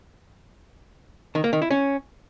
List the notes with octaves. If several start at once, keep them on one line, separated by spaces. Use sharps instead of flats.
D#3
A#3
D#3
E4
C#4